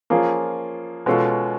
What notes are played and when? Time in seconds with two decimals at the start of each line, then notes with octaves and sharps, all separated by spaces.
0.10 F3 A#3 C#4 F4 G#4
1.06 B2 G#3 C#4 F4 A4